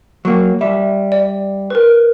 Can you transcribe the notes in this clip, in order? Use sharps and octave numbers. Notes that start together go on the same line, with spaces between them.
F#3 A#3
G3 E5
D5
A#4 B4